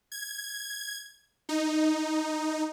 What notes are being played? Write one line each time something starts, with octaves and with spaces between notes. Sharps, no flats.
G#6
D#4